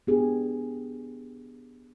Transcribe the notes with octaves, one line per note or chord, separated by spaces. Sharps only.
B3 D4 G4 G#4